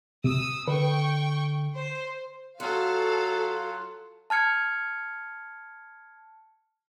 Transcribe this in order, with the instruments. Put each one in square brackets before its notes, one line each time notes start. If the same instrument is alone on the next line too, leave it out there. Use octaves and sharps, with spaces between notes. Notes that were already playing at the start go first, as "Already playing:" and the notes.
[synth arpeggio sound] C3 [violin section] D#6 E6
[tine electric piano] D3 [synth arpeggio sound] B4 [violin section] G5 C#6
[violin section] C5
[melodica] F#3 F4 F#5 [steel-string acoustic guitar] F#4 [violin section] A4 F5
[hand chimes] A5 F6 G#6 C#7